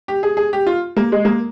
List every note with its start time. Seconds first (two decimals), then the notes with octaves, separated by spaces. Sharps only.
0.08 G4
0.23 G#4
0.37 G#4
0.53 G4
0.67 F4
0.97 A#3
1.12 G#3
1.25 A#3